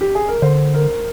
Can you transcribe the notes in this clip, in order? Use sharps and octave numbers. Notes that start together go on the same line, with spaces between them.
G4
G#4
A#4
D3 C5
A#4